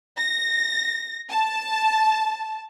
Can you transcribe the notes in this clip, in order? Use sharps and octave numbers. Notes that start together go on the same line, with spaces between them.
A#6
A5